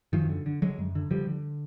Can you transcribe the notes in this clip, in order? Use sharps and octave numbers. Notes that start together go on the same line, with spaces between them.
F#2 D#3 F3
D3
D3
D3 F#3 G#3
F#2
D3
D3 F3 G3
D3